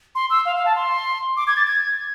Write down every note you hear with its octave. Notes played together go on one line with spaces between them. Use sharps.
C6
E6
F5
F5
A5
C6
D6
G#6
A6
G#6